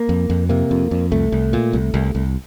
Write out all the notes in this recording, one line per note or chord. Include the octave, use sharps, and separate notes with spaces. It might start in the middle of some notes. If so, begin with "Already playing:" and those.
Already playing: A#3
F2
F2
C3 A#3
F2
F2
C2 A3
C2
A#2
C2
C2
C2